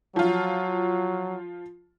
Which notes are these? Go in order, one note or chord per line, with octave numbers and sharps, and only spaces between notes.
F3 F#3 F4